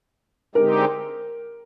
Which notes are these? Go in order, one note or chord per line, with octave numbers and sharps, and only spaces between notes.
D3 G#3 C4 D#4 G4 A#4